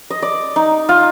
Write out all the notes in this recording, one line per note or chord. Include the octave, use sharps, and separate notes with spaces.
D#5
D5
D#4
F4